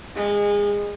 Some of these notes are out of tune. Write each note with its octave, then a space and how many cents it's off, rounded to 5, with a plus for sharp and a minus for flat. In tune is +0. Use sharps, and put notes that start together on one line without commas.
G#3 -25